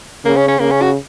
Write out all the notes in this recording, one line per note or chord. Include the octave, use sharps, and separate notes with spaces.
C#3 A#3
C#4
C#4
C#3 A#3
C#4
F#4